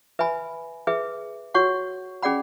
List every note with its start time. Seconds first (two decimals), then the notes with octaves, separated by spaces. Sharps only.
0.19 B4 E5 G#5 B5
0.87 G#4 B4 E5
1.54 F#4 C#5 F#5 C#6
2.23 C#4 G#4 D5 F#5 B5